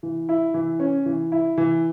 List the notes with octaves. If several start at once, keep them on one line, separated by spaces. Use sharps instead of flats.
E3
E4
E3
C#4
E3
E4
E3